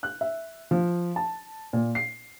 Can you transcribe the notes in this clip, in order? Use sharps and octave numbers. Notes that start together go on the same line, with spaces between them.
F#6
E5
F3
A5
A#2
C7